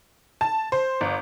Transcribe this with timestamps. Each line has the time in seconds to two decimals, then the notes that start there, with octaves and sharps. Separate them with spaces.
0.41 A5
0.72 C5
1.01 G1